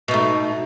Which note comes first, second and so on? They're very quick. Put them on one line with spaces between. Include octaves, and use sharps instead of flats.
B2 D#4 A3